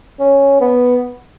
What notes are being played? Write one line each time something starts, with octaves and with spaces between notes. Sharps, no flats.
C#4
B3